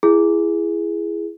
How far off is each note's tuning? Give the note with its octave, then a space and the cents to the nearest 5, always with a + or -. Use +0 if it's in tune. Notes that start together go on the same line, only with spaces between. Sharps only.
E4 +25 G#4 +0